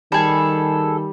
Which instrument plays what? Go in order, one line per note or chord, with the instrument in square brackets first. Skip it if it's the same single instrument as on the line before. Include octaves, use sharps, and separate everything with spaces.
[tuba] D#3 [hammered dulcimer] G3 [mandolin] G#4 A4